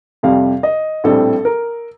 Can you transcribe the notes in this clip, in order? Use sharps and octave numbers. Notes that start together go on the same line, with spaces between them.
F2 C3 G3 F5
D#5
A#1 A2 G3 C4 A4
A#4